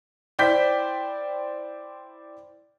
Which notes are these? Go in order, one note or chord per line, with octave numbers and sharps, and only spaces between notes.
E4 C5 D5 G5 G6 B6